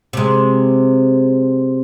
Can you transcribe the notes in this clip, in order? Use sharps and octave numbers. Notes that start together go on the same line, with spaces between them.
C3 G#3